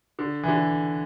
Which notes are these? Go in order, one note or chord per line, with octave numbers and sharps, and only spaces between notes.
D3
E3
D3